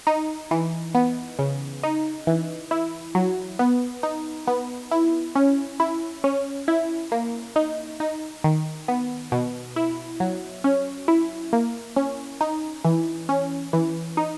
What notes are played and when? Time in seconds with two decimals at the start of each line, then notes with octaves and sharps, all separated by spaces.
0.07 D#4
0.51 E3
0.95 B3
1.39 C#3
1.83 D#4
2.27 E3
2.71 E4
3.15 F#3
3.59 B3
4.03 D#4
4.47 B3
4.91 E4
5.35 C#4
5.80 E4
6.24 C#4
6.68 E4
7.12 A#3
7.56 D#4
8.00 D#4
8.44 D#3
8.88 B3
9.32 B2
9.76 E4
10.20 F#3
10.64 C#4
11.08 E4
11.53 A#3
11.96 C#4
12.41 D#4
12.84 E3
13.29 C#4
13.73 E3
14.17 D#4